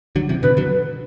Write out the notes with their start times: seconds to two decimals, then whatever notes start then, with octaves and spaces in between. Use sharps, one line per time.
0.16 D3 F#3
0.29 C3 E3
0.43 B2 D3 B4
0.57 D3 F#3